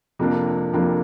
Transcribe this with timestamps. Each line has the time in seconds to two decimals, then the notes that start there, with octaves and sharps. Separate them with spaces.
0.19 F2 C3 F3 A#3 D4
0.73 F2 C3 F3 A#3 D4